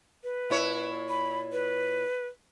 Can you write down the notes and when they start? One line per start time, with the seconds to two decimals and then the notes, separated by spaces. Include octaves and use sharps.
0.24 B4
0.50 A#2 E4 C#5
1.09 B5
1.52 B4